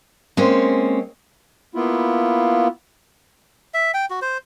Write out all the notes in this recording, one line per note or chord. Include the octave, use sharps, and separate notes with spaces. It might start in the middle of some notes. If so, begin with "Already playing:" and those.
G#3 A#3 C4 C#4
A#3 B3 E4 F4
E5
G5
F#4
C5